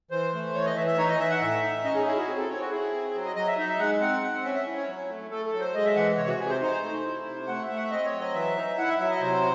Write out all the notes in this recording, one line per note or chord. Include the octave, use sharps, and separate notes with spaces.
E3 C5
A3
E3 C#5
D#5
E3 E5
E5
D#4 C#5
D#5
E3 E5
F#5
A2 E5
D#4
C#4 D#5
G#4
E4 G#4
F#4
C4 G#4
A4
C4 C#5
F#4
E4 G#4
C4
F#3
D#5
F#3 D#5
E5
D#4 E5
E5
G#3 F#5
C4 F#5
C4
C#4 E5
E5
E4
C#5
F#3
A3
A3 A4
A4
F#3
C5
G#3 D#5
E5
E3 F#5
C3 C#5
F#4
C3 G#4
C5
D#4 C5
A3
E4
C3
A3 F#5
E5
A3
F#5
E5
C4 D#5
C#5
F#3
D#5
E3 E5
D#4
E4 F#5
E5
F#3 E5
D#5
C3 C5